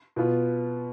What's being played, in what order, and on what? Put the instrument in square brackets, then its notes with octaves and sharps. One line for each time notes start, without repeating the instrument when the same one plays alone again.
[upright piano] B2 B3 F4